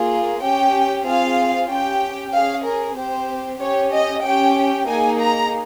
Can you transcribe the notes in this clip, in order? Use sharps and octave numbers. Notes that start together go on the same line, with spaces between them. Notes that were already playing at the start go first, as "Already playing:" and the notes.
Already playing: A#3 F4 G#4
C#4 G4 G5
C4 F4 G#4 F5
C#4 G4 G5
C#4 G#4 F5
A#4
C4 G4 C5
C#4 G4 C#5
D#5
C#4 G4 G5
A#3 D#4 G#4 G#5
A#5